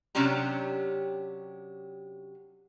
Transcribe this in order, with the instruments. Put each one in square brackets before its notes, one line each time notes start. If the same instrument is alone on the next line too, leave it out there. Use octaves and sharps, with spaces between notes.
[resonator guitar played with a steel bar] C3 F#3 C#4 D4 G4 A#5